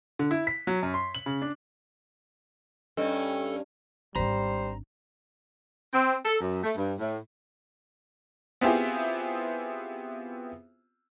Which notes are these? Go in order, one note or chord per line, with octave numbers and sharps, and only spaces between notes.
D3
E4
B6
F#3
F#2
C6
F#7
C#3
D4
G2 C#4 A4 D#5
G#1 G3 D4 C5 A#5
C4
A4
F#2
A3
G2
A2
B3 C4 E4 F4 G4 G#4